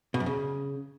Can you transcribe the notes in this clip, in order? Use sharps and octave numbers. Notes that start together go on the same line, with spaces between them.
B2
F#2
C#3